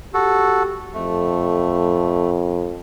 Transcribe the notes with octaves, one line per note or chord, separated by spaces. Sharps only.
F#4 G4 A4
F2 A3